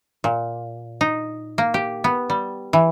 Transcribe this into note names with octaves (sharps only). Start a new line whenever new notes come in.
A#2
D#4
A#3
G4
B3
G3
E3